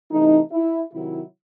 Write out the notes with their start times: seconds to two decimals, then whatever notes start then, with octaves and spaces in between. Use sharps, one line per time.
0.11 C3 E3 A3 D#4
0.52 E4
0.93 C3 D#3 F#3 E4